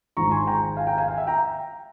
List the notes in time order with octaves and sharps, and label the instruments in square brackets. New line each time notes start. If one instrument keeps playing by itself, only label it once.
[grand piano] G#1 G#2 F3 A#5 C#6
G#5 C6
G5 A#5
F5 G#5
G5 A#5
F5 G#5
F5
E5
G5 A#5